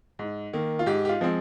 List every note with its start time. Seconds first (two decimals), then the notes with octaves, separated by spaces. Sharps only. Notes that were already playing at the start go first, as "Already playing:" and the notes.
0.19 G#2
0.53 D#3 A#3
0.79 F4
0.86 G#2 G4
1.05 G4
1.09 F4
1.21 F3 G#3 C4